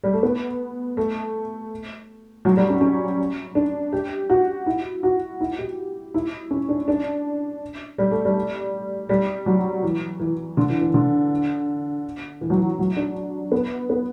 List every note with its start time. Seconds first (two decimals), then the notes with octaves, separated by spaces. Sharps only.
0.04 G3
0.13 A3
0.23 B3
0.97 A3
2.45 F#3
2.57 G3
2.70 C#4
2.81 C#4
3.55 D4
3.92 G4
4.30 F#4
4.66 E4
5.03 F#4
5.41 E4
5.58 G4
6.14 E4
6.51 C#4
6.69 D4
6.88 D4
7.98 G3
8.11 A3
8.25 G3
9.09 G3
9.46 F#3
9.83 E3
10.20 E3
10.57 D3
10.70 E3
10.81 E3
10.94 D3
12.41 E3
12.50 F#3
12.58 E3
12.79 F#3
12.96 D4
13.52 B3
13.90 B3